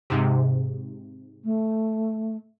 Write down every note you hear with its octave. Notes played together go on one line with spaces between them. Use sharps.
G#2 C3
A3